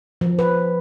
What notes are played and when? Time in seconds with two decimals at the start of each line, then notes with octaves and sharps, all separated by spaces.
0.21 F3
0.39 B4